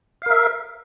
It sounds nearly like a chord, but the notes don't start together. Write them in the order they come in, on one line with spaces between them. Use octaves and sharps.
F5 A#4 E5